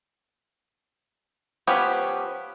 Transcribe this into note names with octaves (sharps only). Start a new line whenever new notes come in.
F3 B3 C#4 G4